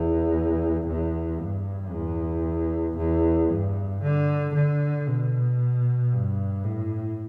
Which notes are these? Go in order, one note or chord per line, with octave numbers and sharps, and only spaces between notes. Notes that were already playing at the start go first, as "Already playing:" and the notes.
Already playing: E2
E2
G2
E2
E2
G2
D3
D3
B2
G2
A2